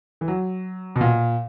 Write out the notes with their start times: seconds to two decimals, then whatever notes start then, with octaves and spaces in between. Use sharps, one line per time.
0.21 E3
0.28 F#3
0.96 B2
1.01 A#2